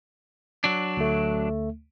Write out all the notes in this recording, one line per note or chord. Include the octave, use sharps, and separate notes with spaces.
F#3 D4
D2 A3